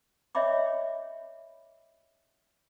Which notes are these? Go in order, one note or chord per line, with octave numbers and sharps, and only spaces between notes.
C#5 D#5 E5 G5 B5 D6